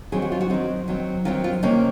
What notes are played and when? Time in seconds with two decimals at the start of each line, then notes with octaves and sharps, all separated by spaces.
0.12 D#3 F#3 C4 G#4
0.22 F#4
0.32 F4
0.41 F#4
0.50 D#3 F#3 C4 D#4
0.88 D#3 F#3 C4
1.25 D#3 F#3 C4 F4
1.44 F4
1.63 C3 D#3 A#3 C#4 D#4